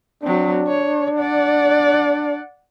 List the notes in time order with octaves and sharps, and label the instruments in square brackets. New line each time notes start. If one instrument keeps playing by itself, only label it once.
[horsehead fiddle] F#3 C4 [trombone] D4
[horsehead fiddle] C#5
D5 F#5